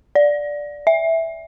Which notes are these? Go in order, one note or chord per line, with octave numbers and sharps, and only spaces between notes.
D5
E5